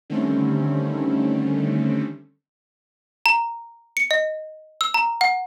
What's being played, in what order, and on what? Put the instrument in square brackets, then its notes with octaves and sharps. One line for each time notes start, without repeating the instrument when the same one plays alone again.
[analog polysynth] D3 D#3 G3 A3 C4 C#4
[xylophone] A#5
C#7
D#5
E6
A#5
F#5